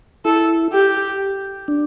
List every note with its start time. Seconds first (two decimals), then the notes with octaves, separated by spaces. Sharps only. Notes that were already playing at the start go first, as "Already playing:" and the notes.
0.25 E4 A4
0.73 G4
1.68 D4